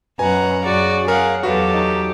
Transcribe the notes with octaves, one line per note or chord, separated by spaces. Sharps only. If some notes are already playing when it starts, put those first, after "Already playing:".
F#2 B2 F#5 G#5 A#5
F#2 C#3 F#4 D5
C#3 G#4 A#4 F5 F#5
E2 F#3 F#4 G4 A4 B4 F5
D#4